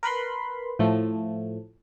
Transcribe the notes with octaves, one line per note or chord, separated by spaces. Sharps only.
A#4 B4 B5 C6
A2 F3 A3